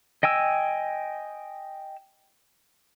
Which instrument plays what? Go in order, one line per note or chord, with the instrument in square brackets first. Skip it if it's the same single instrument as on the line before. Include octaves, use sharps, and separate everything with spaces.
[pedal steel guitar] D#5 G5 G#5 E6